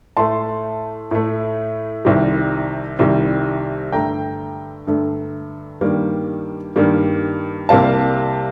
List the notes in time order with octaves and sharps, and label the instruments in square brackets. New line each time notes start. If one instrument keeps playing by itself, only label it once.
[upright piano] A2 A3 A5 C6
A2 A3
C2 C3 D#3 G3
C2 C3 D#3 G3
G2 D3 A3 G5 A#5
G2 D3 A3
G2 D#3 G3 A#3
G2 D#3 G3 A#3
C2 C3 G3 A#3 F5 A5